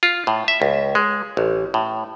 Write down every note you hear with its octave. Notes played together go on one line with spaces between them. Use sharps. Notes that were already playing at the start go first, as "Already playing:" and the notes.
F4
A2
E5
C#2
G#3
A1
A2